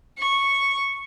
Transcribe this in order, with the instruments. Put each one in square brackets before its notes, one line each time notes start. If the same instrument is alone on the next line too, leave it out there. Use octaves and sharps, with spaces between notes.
[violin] C#6